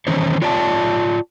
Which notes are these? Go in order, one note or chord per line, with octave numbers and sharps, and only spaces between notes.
D#3 E3 C#4 C5 C#5
F4 C#5 D5 G5 A5